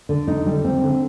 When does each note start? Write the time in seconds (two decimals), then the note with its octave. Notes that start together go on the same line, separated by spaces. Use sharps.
0.09 D3
0.28 D#4
0.46 G3
0.64 C4
0.84 D3